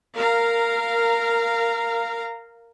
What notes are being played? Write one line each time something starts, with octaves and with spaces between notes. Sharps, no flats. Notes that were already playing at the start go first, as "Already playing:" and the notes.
A#4 F5 A#5